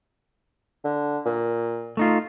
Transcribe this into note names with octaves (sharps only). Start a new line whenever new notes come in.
D3
A#2
A3 D#4 F4